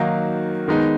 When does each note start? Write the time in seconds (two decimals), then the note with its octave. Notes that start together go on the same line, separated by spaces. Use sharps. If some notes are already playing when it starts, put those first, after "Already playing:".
Already playing: D#3 F#3 A#3 D#4 F#4
0.68 D#3 G#3 B3 D#4